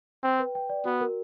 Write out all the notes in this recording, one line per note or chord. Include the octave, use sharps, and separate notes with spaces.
C4 G5
B4
G5
D5
B3 F#4
A#4